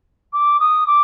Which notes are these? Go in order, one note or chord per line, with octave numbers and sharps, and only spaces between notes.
D6
D#6
D6